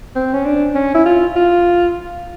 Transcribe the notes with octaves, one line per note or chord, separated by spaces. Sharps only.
C4
C#4
D4
C#4
E4
F4
F4